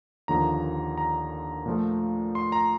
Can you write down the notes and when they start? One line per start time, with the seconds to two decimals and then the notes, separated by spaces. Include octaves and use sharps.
0.28 D#2 D3 F3 A#3 A#5
0.98 A#5
1.66 A#2 F3 A3
2.35 C6
2.52 A#5